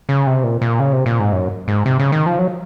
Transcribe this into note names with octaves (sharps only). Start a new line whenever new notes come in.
C#3
C3
A#2
A#2
C#3
C3
A#2
G#2
F#2
G#2
C3
C#3
D#3
F3
F#3